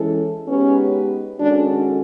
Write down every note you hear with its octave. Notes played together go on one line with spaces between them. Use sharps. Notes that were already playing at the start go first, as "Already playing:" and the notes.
Already playing: E3 G#3 C#4 E4 A4
G#3 B3 C#4 D#4 G4 B4
D#3 G#3 C#4 D4 F#4 A4